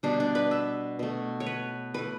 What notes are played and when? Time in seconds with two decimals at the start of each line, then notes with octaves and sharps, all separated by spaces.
0.03 B2 G3 B3 D4
0.20 D4
0.35 B4
0.51 E5
0.99 B2 A3
1.40 C#5
1.46 B4
1.94 E3 A3 B4